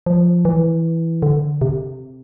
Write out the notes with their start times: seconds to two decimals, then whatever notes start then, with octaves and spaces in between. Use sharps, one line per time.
0.06 F3
0.45 E3
1.22 D3
1.61 C3